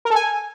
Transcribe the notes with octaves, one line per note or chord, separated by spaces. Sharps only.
A#4
A4
G#5